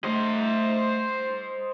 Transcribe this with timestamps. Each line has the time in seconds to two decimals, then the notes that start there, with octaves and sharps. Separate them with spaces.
0.04 A3 C5 D#5